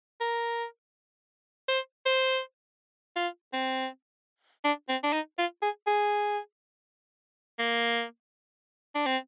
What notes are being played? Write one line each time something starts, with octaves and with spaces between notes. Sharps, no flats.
A#4
C5
C5
F4
C4
D4
C4
D4
D#4
F4
G#4
G#4
A#3
D4
C4